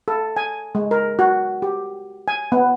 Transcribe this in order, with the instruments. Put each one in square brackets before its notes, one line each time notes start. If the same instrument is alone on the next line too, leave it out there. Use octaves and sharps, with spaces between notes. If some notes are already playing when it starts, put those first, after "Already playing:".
[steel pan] A4
G#5
G#3
A#4
F#4
G4
G#5
B3